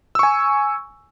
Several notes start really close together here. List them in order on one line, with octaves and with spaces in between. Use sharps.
E6 C#6 G#5